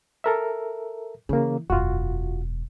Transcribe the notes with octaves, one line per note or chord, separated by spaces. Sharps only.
A4 A#4 E5
C#3 E3 A#3
E1 F#2 F4 F#4